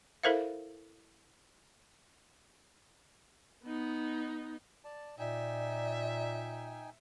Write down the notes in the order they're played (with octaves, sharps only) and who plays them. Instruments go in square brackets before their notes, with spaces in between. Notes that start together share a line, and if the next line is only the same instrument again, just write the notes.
[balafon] E4 A4 A#4 C5 E5 F5
[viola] B3 D#4
[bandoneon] D5 A5
[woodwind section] A#2 [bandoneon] D#4 G5 G#5 [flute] D5 [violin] E5